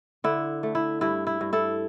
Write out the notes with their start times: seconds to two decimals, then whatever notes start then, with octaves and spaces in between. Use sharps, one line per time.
0.24 D3 E4
0.63 A3
0.75 E4
1.01 G2 E4
1.27 E4
1.41 G2
1.53 E4 A4